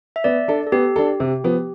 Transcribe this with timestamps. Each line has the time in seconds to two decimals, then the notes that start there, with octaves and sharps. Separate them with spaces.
0.16 E5
0.24 B3 D5
0.48 D4 A4
0.67 A4
0.72 B3 G4
0.96 D4 A4
1.20 C3
1.44 F3 B3